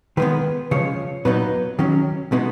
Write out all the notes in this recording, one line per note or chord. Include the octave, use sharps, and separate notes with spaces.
D#3 G#3 B3 B4
C#3 F3 G#3 C#5
A#2 F#3 B3 D#4 B4
D#3 F#3 C#4
B2 G#3 B3 D#4